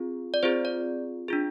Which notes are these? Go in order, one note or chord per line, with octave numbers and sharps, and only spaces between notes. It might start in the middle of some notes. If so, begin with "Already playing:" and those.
Already playing: C4 F4 G#4
D5
C4 F4 G#4 C5
D5
D4 F4 G#4